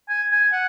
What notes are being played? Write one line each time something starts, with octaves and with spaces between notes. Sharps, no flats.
G#5
G#5
F#5